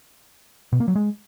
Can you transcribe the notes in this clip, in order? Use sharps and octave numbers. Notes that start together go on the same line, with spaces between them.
B2
A#3
F#3
G#3